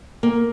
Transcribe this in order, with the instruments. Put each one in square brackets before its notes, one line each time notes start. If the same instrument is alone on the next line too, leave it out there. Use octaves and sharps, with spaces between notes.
[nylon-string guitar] A#3